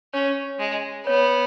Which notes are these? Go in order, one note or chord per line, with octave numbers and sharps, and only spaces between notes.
C#4 C#5
G#3
B3 C#5